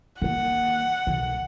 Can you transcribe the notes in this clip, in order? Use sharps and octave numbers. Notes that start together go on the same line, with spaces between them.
D#3 A#3 F#5
B1 D#3